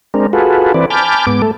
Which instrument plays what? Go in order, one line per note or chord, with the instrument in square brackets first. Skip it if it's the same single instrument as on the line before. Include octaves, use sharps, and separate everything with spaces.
[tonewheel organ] G#3 C4 D4 A#4
F4 F#4 G#4 A4 B4
E3 C4 B4 D5
G#5 A5 B5 D6 F6 G6
G#2 B3 D6
A3 A4